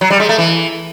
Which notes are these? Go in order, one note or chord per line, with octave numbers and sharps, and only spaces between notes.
F#3
G3
G#3
A3
E3